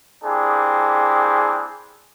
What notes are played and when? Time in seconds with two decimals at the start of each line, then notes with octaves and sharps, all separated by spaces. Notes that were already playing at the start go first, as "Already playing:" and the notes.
0.24 A#3 C4 D4 E4 G4 G#4